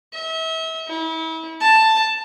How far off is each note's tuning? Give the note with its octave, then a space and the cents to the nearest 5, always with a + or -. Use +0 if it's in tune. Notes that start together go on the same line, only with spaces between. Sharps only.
E5 -35
E4 -35
A5 +10